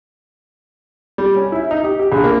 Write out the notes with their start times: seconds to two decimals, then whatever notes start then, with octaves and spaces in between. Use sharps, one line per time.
1.18 G3
1.36 C#4
1.52 E4
1.71 D#4
1.84 G4
1.99 G4
2.12 A#1
2.24 A#3